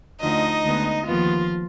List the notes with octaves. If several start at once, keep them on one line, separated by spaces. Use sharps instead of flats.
D2 D3 F3 D#4 D#5
D2 D3 G#3 B3
D#2 D#3 F3 B3 F4